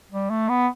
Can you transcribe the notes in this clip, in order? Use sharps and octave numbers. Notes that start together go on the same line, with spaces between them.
G3
A3
B3